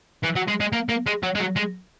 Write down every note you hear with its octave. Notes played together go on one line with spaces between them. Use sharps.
E3
F#3
G#3
G#3
A#3
A#3
G#3
F#3
G#3
F#3
G#3